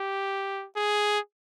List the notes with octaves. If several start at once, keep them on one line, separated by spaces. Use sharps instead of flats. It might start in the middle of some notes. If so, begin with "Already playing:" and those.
Already playing: G4
G#4